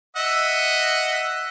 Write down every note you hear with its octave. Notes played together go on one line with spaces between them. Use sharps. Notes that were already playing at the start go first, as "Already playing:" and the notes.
D#5 E5 F#5